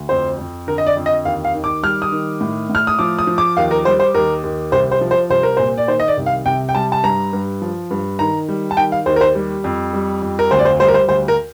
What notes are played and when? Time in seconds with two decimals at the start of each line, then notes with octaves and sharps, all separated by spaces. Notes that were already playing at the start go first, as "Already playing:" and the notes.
Already playing: D2
0.09 F2 C5
0.38 F2
0.67 D3 A#4
0.78 D#5
0.87 D5
0.97 F2
1.06 D#5
1.25 D#2 F5
1.45 F5
1.54 D#3
1.64 D6
1.83 G3 F6
2.02 D#6
2.12 D#3
2.41 A2
2.70 A2
2.75 F6
2.87 D#6
2.99 F3 D6
3.19 D#6
3.27 F3
3.38 D6
3.57 D#2 F5
3.71 A#4
3.85 G3 C5
4.00 C5
4.15 D#2 A#4
4.43 D#2
4.72 C2 C5
4.92 C5
5.01 F3
5.11 C5
5.30 C2 C5
5.43 A#4
5.57 A#2 C5
5.78 D5
5.88 D#3 C5
6.00 D#5
6.08 D5
6.18 C2
6.26 F5
6.46 C3 G5
6.69 G5
6.75 G3 A5
6.92 A5
7.03 G2 A#5
7.33 G2
7.62 F3
7.91 G2
8.19 D#3 A#5
8.49 G3
8.71 A5
8.77 D#3 G5
8.92 F5
9.06 D#2 C5
9.16 A#4
9.21 C5
9.35 G3
9.64 F2
9.93 G3
10.22 F2
10.39 A#4
10.51 D2 C5
10.59 D5
10.65 C5
10.80 G3 C5
10.88 A#4
10.94 C5
11.08 D2 C5
11.28 A#4